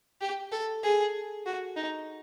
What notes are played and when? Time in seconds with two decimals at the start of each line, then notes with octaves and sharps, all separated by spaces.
0.21 G4
0.52 A4
0.84 G#4
1.46 F#4
1.76 D#4